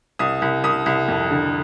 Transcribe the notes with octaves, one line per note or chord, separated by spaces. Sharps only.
C2 D#6
C2
C2 D#6
C2
F2
D3